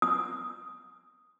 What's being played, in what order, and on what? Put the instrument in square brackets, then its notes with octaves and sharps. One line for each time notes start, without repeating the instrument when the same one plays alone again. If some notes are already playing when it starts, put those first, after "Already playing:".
[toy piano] D#6